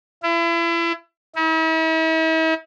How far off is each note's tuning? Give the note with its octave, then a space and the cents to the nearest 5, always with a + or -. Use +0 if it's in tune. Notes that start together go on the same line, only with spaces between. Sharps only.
E4 +35
E4 -45